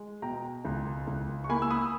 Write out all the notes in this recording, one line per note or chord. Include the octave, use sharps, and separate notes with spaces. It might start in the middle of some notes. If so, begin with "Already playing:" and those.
Already playing: G#3
B2 G5 A#5
C#2
C#2
C#6
A#3 G#5 B5
E6
B5 D#6